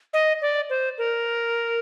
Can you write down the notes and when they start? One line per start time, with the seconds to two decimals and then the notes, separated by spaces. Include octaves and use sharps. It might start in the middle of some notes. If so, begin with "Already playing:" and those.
0.13 D#5
0.42 D5
0.70 C5
0.98 A#4